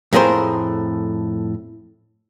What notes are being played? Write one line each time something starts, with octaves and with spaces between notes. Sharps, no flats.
F2 A2 G#4 A#4 C5